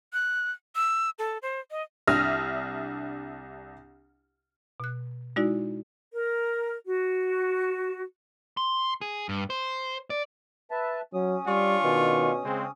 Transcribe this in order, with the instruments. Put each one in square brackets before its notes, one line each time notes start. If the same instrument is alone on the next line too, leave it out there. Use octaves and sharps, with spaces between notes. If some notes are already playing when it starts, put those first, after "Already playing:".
[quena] F#6
E6
A4
C5
D#5
[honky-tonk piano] C2 D4 E5 D#6 F6 A#6
[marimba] B2 F#6
G#3 D#4 E4 F#4 D5
[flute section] A#4
F#4
[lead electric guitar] C6
G#4
G2
C5
D5
[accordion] B4 E5 A5
[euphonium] F#3 [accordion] C#4 D#6
[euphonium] G3 [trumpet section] D4 F4 C#6
[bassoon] B2 [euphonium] D#3
[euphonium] C#3 [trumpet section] G#3 C4